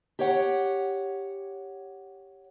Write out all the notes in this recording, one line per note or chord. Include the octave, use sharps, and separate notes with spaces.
G4 C#5 F#5